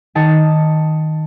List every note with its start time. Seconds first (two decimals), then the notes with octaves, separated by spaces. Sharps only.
0.15 D#3 D#5 A5 C#7